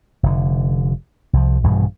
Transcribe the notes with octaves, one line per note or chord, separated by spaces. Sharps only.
F1 D3
C2 F3
A#1 G2 B2 E3